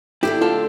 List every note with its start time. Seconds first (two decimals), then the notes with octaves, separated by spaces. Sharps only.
0.23 D3 A3 D4 E4 G4
0.41 F4 A4